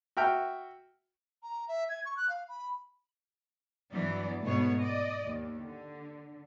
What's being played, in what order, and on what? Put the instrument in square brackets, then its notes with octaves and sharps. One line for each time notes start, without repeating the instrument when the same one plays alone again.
[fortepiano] F#4 E5 G5 F6
[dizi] A#5
E5
G#6
C#6
F#6
F5
B5
[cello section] G2 E3 F#3 B3 D5
G#2 B2 A3 B3 C#5
D5 D#5
D#2
D3